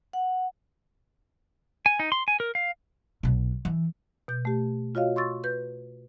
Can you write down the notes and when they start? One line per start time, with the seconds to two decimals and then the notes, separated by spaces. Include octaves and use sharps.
0.13 F#5
1.86 G#5
2.00 D#4
2.12 C6
2.28 G#5
2.40 A#4
2.55 F5
3.23 B1 B2
3.65 E3
4.28 B2 G6
4.45 A3 G4
4.95 F4 F#4 C#5 D#5 F5
5.16 C6 C#6 E6 A6
5.44 B4 G6